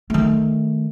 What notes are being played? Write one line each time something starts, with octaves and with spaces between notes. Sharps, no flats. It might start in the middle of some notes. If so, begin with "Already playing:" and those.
D#3 A3